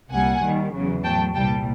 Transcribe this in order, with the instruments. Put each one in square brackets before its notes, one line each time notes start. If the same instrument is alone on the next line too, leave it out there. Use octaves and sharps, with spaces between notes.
[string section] C2 A#2 G3 F#5 G#5
D#2 D#3 G3
E2 C#3 F#3
A2 F#3 G5 A5
C2 A#2 G3 G5 A5